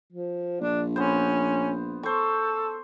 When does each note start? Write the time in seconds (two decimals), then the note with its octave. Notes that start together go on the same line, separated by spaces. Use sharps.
0.12 F3
0.61 A#1 D4
0.96 B3 C#4 C5
2.03 A4 C5 C#6